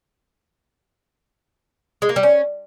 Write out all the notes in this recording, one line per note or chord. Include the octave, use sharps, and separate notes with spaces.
G#3
A#3
G3
C#4